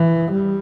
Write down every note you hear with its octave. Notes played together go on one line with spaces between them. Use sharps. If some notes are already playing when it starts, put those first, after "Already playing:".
Already playing: E3
G3